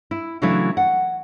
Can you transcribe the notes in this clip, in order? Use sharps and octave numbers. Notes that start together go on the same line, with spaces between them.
E4
C#3 E3 F#3 A3 D4 E4
F#5